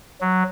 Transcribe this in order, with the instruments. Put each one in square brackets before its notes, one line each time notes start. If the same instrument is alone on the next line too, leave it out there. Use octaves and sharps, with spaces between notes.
[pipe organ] F#3